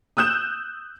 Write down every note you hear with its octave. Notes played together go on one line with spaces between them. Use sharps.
D#6 E6 F#6 G6 E7